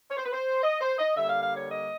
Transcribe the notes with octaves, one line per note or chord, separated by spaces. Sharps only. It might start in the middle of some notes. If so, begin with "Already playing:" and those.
C#5
C5
B4
C5
D#5
C5
D#5
D3 G3 A#3 E5
F5
F5
C#5
D#5